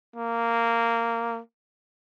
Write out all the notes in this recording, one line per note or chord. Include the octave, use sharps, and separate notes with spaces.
A#3